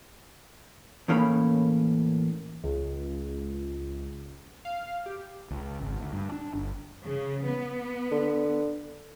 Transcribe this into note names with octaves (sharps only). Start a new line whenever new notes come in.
E2 A2 A#3 C#4 C#5 B5
C#2
F5
G4
C#2
G#1
D2
G2
D4
G1
C#3
B3
D3